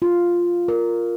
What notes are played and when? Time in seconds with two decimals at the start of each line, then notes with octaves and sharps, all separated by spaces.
0.02 F4
0.68 A#4